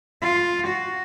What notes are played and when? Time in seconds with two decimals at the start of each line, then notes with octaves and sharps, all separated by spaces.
0.22 F4
0.67 F#4